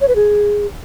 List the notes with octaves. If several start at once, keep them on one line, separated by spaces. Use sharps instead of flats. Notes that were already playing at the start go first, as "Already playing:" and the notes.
C#5
B4
G#4